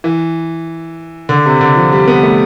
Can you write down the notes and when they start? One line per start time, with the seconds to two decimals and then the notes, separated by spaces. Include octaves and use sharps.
0.04 E3
1.29 D3
1.46 C3
1.61 D3
1.76 F3
1.92 G3
2.07 B3
2.23 A3